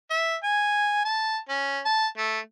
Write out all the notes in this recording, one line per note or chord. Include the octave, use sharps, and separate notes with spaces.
E5
G#5
A5
C#4
A5
A3